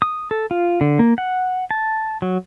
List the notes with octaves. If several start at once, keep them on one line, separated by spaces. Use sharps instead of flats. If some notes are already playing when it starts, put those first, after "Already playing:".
D#6
A4
F4
D3
A#3
F#5
A5
F#3